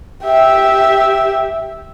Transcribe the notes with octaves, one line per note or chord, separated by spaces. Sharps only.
G4 E5